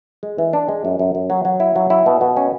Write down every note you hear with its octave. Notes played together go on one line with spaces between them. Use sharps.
G#3
E3
D4
G#3
F#2
F#2
F#2
F#3
F#3
E4
F#3
E4
B2
B2
C#4